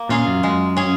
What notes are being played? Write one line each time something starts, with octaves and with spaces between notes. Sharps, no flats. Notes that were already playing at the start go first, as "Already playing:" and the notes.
Already playing: A#3
A#2 C#4 F4 G#4
F#2
F#2 G#3
C#4 G#4